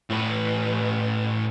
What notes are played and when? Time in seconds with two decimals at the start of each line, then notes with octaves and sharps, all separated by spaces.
0.11 A2 B4